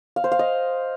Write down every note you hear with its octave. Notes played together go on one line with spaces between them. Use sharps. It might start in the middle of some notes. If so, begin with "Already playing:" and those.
F5
C5
F5
D#5